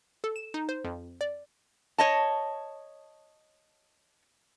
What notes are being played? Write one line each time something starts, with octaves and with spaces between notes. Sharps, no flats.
A4
E7
D#4
C5
F2
D5
C#5 D#5 A5